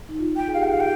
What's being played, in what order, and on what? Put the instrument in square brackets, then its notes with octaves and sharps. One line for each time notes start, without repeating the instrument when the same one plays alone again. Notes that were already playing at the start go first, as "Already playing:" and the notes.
[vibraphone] D#4
F4
[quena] G5
[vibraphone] G#4
[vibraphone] G4 [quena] F5
[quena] G5
F5
G5